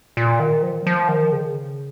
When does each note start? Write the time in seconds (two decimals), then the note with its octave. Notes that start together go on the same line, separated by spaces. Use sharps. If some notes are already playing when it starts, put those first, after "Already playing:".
0.17 A#2
0.40 D#3
0.63 F3
0.86 F3
1.08 D#3
1.32 C#3